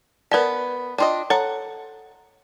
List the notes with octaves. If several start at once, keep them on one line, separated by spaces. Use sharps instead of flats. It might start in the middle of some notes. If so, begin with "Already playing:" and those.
B3 A#4 B4 D5 A5
D4 F4 D#5 G5
A4 C#5 F#5 A#5